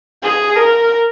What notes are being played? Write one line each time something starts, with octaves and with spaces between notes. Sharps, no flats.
G#4
A#4